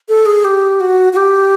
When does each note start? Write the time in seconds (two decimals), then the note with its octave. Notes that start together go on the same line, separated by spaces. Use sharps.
0.09 A4
0.26 G#4
0.45 G4
0.80 F#4
1.13 F#4
1.16 G4